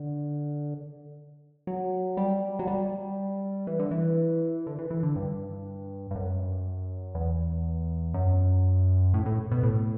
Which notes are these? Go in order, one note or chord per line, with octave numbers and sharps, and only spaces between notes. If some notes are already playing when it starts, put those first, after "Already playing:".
Already playing: D3
F#3
G3
F#3
G3
E3
D3
E3
D3
E3
E3
D3
G2
G2
F#2
E2
F#2
A2
A2
B2
A2